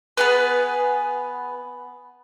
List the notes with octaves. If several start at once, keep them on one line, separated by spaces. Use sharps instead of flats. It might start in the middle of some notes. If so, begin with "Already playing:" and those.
B3 G#4 B4